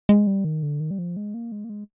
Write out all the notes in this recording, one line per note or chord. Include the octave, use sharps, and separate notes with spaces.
G#3
G3
D#3
D3
D#3
G3
F3
G#3
A#3
G#3
A#3
G#3